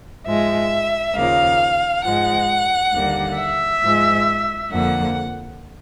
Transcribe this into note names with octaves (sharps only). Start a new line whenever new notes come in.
G#2 F3 G#3 E5
D#2 C#3 F3 A#3 F5
G#2 F3 G#3 F#5
D#2 D3 G3 A#3
E5
G#2 F3 G#3
F2 D3 F3 A#3 F#5